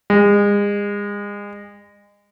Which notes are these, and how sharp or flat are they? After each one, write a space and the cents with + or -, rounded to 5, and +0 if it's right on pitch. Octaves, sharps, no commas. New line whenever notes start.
G#3 -35